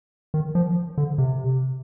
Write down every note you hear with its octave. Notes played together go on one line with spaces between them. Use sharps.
D#3
F3
D3
C3